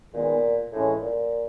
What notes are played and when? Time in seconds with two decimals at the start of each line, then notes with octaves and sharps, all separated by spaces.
0.13 A#2 D#3 G#3 B3
0.72 A2 E3 G#3 C#4
1.01 A#2